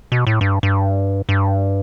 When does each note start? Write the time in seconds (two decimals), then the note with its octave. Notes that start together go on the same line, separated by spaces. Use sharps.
0.12 B2
0.27 A2
0.41 G2
0.63 G2
1.29 G2